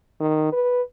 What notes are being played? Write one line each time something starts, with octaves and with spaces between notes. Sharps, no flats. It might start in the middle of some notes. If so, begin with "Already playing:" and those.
D#3
B4